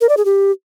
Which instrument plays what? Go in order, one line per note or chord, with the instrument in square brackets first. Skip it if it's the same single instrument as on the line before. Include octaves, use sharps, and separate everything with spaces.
[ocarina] A#4
D5
G#4
G4